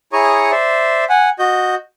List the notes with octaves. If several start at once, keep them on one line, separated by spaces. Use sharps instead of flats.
E4 G#4 C#5 A#5 C#6 D#6
C5 D5 E5
F#5 G#5
F#4 D#5 G6